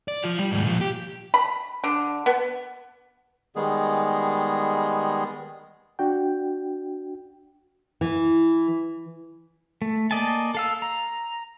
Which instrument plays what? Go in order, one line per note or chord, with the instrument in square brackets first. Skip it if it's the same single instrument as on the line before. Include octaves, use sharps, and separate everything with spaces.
[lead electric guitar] D5
F3 F4
G3
D#2 G#2
A#2 F3
G4
[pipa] B5
D3
B3
[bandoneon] D#3 G3 G#3 B3 G#4
[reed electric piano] D4 F#4 G5
[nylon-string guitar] E3
[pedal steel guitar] A3
A#3 D5 D#5 G#5 A5
A4 F5 E6
A#5